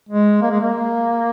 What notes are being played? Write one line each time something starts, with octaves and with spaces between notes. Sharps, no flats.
G#3
A#3
G#3
A#3